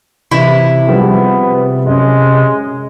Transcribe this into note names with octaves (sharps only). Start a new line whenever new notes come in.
C3 E3 E4
F3 G3 B3 G#4
F#2 G#3